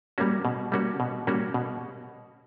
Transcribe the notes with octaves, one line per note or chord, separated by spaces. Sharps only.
G3 A#3 C#4 F#4
B2
G3 A#3 C#4 F#4
B2
G3 A#3 C#4 F#4
B2